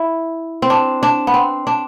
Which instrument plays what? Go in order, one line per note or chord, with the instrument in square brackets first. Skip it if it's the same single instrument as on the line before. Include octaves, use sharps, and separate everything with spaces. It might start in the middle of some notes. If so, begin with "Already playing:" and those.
Already playing: [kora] E4
C4
D4
D4
B3
C4
D4